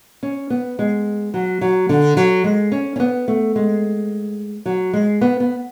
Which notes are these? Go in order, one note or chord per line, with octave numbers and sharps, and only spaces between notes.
C#4
B3
G#3
F#3
F#3
D3
F#3
G#3
C#4
C#4
B3
A3
G#3
F#3
G#3
B3
B3